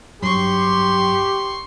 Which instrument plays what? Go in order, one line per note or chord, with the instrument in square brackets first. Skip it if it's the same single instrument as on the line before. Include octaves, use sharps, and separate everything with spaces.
[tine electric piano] G2 F#3 [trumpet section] G4 [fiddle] C6 C#6